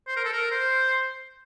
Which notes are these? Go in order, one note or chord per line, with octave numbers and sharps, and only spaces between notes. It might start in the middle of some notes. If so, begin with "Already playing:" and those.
C5
A#4
A4
A#4
C5